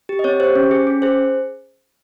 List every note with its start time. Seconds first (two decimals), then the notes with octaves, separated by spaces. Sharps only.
0.09 G4
0.19 D#5
0.24 C4 C#5
0.40 G4 C5
0.55 C#4
0.71 G#4
0.87 C#4
1.02 G#4 C5